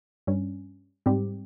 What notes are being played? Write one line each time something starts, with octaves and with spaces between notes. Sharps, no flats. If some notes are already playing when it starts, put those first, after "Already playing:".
G2 G3 C#4
G#2 G3 C4 G4